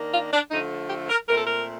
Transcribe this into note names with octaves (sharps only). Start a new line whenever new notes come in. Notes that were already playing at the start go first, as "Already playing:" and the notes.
Already playing: D#3 A#3 D4
F4
D4
D3 F3 A3 D#4
G4
A#4
A#2 A3 C4 A#4
A4
A#4